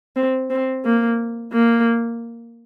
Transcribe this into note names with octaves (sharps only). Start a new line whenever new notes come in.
C4
C4
A#3
A#3